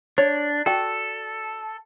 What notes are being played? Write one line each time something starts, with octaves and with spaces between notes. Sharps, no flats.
D4 C#5
F#4 A4 D5 G5